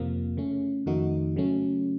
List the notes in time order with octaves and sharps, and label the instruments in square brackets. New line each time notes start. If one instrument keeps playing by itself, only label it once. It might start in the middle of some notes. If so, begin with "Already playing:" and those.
Already playing: [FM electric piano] F2 C3 F3 A#3
C#3 A3 C#4
F2 D#3 A3 D#4 F#4
C#3 F#3 A3 C#4